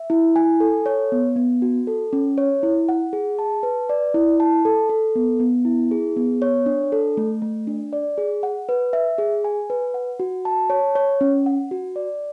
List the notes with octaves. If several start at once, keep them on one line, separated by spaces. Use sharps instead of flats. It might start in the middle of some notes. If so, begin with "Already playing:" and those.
Already playing: E5
E4
G#5
A4
C#5
B3
B3
F#4
A4
C#4
C#5
E4
F#5
G#4
A5
B4
D5
E4
A5
A4
A4
B3
B3
E4
G#4
B3
C#5
D4
A4
A3
A3
D4
D5
G#4
F#5
B4
E5
G#4
G#5
B4
F#5
F#4
A5
C#5
C#5
C#4
F#5
F#4
D5